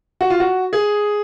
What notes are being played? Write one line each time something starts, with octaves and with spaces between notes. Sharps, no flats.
F#4
F4
F#4
G#4